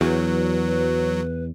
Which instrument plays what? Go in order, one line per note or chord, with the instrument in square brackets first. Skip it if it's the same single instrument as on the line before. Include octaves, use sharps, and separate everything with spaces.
[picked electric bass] E2 [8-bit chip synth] F#3 [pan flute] B4